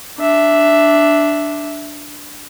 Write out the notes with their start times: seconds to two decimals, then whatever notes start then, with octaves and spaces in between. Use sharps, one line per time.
0.19 D4 E5